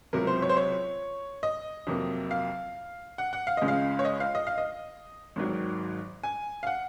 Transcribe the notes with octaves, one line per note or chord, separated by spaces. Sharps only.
C#2 C3 F#3 A#4
C5
C#5
C5
C#5
D#5
F2 C3 F#3 A#3
F5
F#5
F#5
F5
C#2 C#3 G#3 D#5
F5
C#5
D#5
F5
D#5
F5
D#5
G#1 G#2 D#3 F#3
G#5
F5
F#5